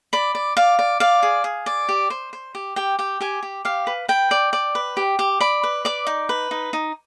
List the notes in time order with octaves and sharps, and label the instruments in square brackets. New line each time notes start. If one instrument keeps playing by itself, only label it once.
[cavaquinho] D5 B5
D5
D5 F5
D5
D5 F5
G#4
G#4
D5
G4
C5
C5
G4
G4 G5
G4 G5
G4 G#5
G4
G4 F5
B4
B4 G5
D5
D5
B4
G4
G4
D5 B5
B4
D5 D6
D#4
B4
D#4
D#4